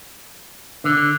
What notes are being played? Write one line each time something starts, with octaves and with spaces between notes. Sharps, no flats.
D3